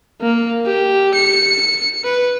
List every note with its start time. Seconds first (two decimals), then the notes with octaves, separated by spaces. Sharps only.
0.21 A#3
0.66 G4
1.14 C#7
2.05 B4